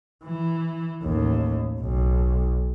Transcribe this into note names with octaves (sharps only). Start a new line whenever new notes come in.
E3
A1 D#2
B1